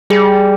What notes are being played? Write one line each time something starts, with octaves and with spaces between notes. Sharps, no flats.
G3 G#4